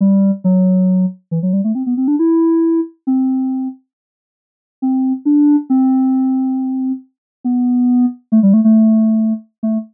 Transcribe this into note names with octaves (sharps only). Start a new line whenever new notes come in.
G3
F#3
E3
F#3
G3
A3
C4
B3
C4
D4
E4
C4
C4
D4
C4
B3
A3
G3
A3
A3
A3